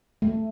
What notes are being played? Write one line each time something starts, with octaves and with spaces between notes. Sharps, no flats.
A3